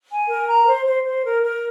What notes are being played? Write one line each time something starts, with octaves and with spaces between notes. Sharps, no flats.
G#5
A#4
A#5
C5
C5
C5
A#4
A#4